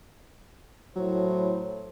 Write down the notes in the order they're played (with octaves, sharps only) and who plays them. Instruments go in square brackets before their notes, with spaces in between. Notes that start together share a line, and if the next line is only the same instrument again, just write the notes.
[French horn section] A2 E4 C5 [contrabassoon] F#3